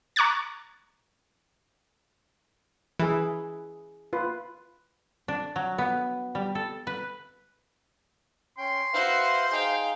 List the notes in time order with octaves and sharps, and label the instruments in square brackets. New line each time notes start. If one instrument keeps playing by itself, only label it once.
[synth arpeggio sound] A#5 C#6 D6 F#6 G#6 A6
[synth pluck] E3 [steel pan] E4 G#4
[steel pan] F4 B4
[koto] D4
F#3
B3
G3
A4
B4
[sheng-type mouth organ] C#4 G5 G6 [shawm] C6
[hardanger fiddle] F#4 [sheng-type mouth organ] B4 E5 F5 [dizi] C5
[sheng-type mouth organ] D#4 G#4 [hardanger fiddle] F5 G5